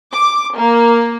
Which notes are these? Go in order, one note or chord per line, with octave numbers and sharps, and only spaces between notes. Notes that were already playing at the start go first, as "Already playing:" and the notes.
D6
A#3